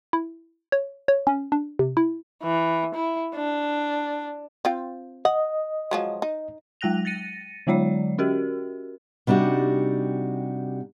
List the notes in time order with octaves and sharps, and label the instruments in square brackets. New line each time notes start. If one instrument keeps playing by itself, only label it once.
[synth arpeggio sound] E4
C#5
C#5
C#4
D4
C3
E4
[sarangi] E3
E4
D4
[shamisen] C4 F4 G5
[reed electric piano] D#5 [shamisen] F#5
[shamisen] F3 F#3 G#3
D#4
[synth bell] F#3 G#3 G5 F#6 A#6 F7
A6 A#6 C#7 D#7
D3 F#3 G#3 C#5 D5
C#4 F#4 G4 A#4
[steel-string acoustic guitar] C3 G3 D4 D#4 F#4